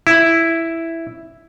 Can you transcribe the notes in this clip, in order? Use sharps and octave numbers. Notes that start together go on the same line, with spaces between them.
E4